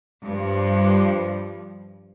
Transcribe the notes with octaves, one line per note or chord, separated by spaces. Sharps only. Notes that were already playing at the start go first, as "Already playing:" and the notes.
G2 F3